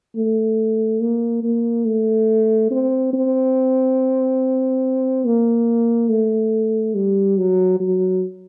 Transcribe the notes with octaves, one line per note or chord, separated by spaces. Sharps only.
A3
A#3
A#3
A3
C4
C4
A#3
A3
G3
F#3
F#3